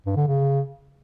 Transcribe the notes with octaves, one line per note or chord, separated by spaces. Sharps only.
G2
D3
C#3